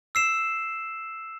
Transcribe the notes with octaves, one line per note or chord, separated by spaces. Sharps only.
E6 C7 E7